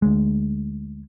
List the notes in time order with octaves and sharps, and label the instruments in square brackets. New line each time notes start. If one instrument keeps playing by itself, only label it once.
[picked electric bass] D2 G#3